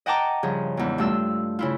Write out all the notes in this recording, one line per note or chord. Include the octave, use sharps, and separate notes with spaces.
D#5 F#5 G5 A5 A#5 D6
G2 C#3 F3 G#4
E2 G#2
G2 A3 F4 E6
C#3 E4 F4